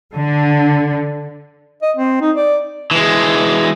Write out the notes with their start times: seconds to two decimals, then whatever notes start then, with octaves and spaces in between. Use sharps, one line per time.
0.15 D3
1.82 D#5
1.96 C4
2.21 D#4
2.36 D5
2.91 E3 G#3